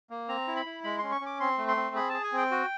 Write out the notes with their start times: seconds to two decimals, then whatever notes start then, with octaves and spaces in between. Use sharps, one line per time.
0.10 A#3
0.28 C4 A#5
0.48 E4
0.56 B5
0.66 E4
0.84 G#3 B5
0.98 C6
1.03 C#4
1.12 C#6
1.21 C#4 D6
1.40 C4 C6
1.58 A3
1.68 C6
1.77 C4
1.96 G#4 B5
2.09 G#4 A5
2.24 G#5
2.32 C4
2.37 G5
2.51 F#4